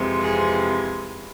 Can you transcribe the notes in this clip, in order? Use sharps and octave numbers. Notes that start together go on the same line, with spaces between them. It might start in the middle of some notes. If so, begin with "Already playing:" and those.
Already playing: F2 C3 E3 G#3
G#4